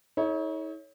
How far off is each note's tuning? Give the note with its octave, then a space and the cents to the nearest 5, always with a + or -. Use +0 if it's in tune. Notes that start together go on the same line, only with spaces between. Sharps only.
D#4 +45 A4 -40 C#5 +0